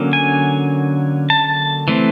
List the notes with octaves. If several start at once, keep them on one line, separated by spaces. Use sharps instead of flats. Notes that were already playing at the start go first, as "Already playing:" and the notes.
Already playing: D3 F#3 A#3 C#4
G#5
A5
E3 A3 C4